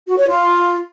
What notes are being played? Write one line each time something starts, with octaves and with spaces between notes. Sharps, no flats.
F#4
C#5
F4